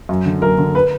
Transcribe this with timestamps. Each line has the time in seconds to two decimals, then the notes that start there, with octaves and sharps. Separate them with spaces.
0.09 F#2
0.26 D3
0.42 F#2 A#4
0.58 D3
0.75 B4